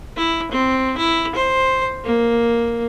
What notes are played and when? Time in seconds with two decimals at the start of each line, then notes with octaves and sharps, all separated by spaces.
0.17 E4
0.52 C4
0.98 E4
1.36 C5
2.04 A#3